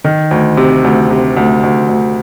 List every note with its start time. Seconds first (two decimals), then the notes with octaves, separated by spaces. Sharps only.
0.04 D#3
0.31 D2
0.57 C3
0.84 D2
1.10 C3
1.37 D2
1.63 D2
1.88 D2